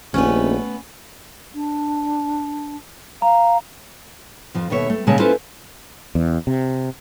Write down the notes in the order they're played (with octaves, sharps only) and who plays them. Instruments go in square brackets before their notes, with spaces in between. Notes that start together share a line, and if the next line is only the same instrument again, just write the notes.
[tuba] D#1 [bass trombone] A#1 [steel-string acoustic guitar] A3 B3 B4 [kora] C#4
[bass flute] D4
[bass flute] F5 [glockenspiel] A#5
[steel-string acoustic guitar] F2 F3
D#2 B2 A4 C#5 E5
A3
A#2 C#3 G#3 C#5 E5 A5
C#4 E4 F4 A4 B4 C5
[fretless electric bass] E2
C3